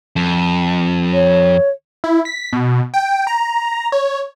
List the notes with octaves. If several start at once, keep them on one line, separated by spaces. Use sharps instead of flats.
F2
C#5
E4
B6
B2
G5
A#5
C#5